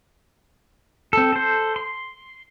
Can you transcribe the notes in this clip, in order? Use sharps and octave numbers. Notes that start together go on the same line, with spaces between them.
C4 A4
A4 C5
C6